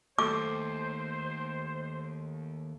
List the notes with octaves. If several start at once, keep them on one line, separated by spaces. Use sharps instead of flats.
D#2 A3 C5 D6